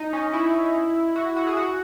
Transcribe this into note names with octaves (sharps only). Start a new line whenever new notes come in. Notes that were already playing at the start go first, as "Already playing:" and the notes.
Already playing: D#4
C#4
E4
F#4
F#4
G#4
F#4